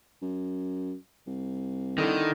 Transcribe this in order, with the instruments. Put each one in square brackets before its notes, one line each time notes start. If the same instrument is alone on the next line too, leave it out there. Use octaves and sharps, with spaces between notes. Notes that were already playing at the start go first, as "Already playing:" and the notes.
[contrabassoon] F#2
C2
[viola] D3 E4 [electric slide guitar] D#3